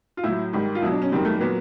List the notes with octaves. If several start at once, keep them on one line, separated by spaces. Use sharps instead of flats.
F4
A2 F#3 E4
G#2 D#3 G3
F4
B2 F#3 E4
D4
C#4
F#2 D#3 G3 C4
A3
A#3
A#2 F#3 B3